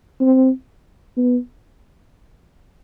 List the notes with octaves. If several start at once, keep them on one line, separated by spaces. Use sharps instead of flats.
C4
B3